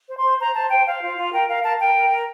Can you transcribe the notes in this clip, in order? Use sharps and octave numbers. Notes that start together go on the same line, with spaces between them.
C5
C6
C5
C5 A#5
C5 A5
C5 G5
C5 F5
F4
F4
A#4 G5
A#4 F5
A#4 A5
A#4 G5
A#4
A#4